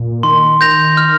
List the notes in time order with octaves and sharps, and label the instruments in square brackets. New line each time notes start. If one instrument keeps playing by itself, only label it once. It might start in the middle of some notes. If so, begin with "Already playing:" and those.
Already playing: [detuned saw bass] A#2
[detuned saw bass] D#3 [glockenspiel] C6
[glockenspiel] G6 A#6 F7
F6